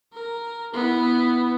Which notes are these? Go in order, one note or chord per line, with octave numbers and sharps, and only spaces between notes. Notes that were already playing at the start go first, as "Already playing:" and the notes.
A#4
B3 E4